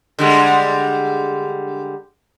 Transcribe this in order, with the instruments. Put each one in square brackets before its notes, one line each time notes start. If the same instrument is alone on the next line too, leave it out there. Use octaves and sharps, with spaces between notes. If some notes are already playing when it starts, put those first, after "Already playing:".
[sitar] D3 G3 G#3